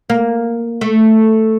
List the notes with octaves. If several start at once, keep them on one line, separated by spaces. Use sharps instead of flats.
A#3
A3